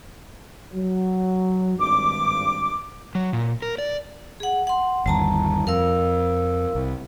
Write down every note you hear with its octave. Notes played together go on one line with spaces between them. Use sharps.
F#3
G#1 G2 D6
F#3
A#2
A#4
D5
G#4 F#5
F#5 C6
G1 D#2 G3 A5 A#5
F2 A#4 F5 E6
C2